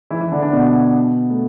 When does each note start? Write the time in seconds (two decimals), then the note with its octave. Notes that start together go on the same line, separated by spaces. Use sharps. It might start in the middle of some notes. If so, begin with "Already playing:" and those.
0.10 E3 E4
0.21 E3 E4
0.31 D3 D4
0.42 D3 D4
0.53 B2 B3
1.29 A3